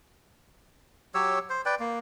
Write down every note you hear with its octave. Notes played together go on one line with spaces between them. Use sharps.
F#3 G4 C#5 E6
C5
B4 D5 G5
A#3